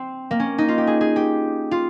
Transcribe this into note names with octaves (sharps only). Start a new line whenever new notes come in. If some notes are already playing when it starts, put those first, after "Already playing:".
Already playing: C4
A#3
C#4
D#4
F4
G4
G#4
G#4
G4
F4